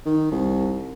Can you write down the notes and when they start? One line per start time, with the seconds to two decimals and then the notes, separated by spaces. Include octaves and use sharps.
0.06 D#3
0.31 C2